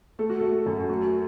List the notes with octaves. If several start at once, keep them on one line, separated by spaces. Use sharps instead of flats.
A3 A4
F#4
A3 A4
F#2
A3 F#4